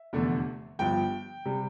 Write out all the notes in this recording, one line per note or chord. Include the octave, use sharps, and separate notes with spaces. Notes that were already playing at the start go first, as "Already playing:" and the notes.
Already playing: E5
F1 E2 D3 A3
G1 G2 F3 G5
C3 G3